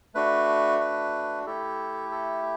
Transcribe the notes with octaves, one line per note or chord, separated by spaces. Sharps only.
A3 D4 F#4 B4
B4
A3 E4 G4 A4
A4